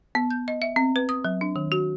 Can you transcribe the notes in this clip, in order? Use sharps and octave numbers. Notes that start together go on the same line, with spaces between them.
B3
G6
D#5
E5
C4
B4
D#6
F#3
D4
D#3
F#4